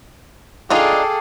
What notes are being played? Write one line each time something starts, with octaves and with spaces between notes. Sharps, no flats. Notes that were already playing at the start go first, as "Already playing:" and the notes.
D4 D#4 F4 G#4 A4 F5 G5 D6